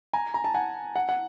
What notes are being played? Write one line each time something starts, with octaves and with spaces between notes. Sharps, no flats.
G#5 A#5
A#5
A5
F#5 G#5
F#5
F#5